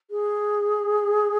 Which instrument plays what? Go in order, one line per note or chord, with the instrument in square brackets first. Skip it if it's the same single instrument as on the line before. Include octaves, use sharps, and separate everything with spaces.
[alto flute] G#4